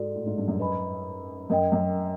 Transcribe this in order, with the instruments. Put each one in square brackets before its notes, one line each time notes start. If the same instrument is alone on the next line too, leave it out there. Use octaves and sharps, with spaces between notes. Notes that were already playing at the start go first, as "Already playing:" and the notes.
Already playing: [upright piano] G#2 [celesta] F#4 A4 D5
[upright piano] A2
G#2
G2
F#2
[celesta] B4 D#5 G#5 B5
[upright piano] F#2 [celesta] A#4 D#5 G5
[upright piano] F#2